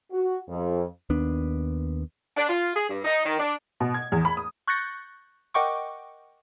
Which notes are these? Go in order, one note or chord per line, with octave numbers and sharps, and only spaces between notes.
F#4
F2
D#2 B3 D4
D4
F4
G#4
G2
D#4
D#3
D4
B2
G#6
E2
B5
D#6
C#6 F#6 G6 A6 A#6 C#7
A#4 D#5 F#5 G5 C#6 D6